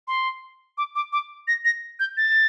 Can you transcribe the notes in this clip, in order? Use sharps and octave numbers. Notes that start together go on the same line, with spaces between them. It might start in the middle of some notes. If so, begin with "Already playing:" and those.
C6
D6
D6
D6
A#6
A#6
G6
A6